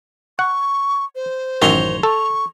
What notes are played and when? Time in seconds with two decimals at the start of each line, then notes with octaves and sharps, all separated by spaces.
0.39 F#5 C#6
1.15 C5
1.62 A1 F#2 D#3 C#5 A#5 C6
2.03 A4 C#6